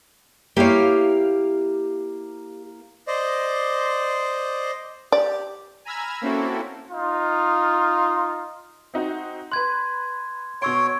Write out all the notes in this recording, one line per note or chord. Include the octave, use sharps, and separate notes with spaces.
A#3 E4 G4 C#5 F5
C5 D5 D#5
G4 D5
G#5 A#5 B5 E6 F6 G#6
A#3 C4 C#4 E4 F#4 A4
D#4 F4
C4 D#4 F#4
B4 C6 F#6 G#6
B2 C#5 C6 C#6 E6 D7